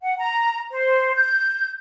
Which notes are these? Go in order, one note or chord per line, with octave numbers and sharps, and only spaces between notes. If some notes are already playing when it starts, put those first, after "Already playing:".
F#5
A#5
C5
G6